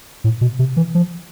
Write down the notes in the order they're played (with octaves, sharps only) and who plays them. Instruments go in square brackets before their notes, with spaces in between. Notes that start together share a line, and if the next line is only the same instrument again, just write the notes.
[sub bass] A2
B2
C3
E3
F3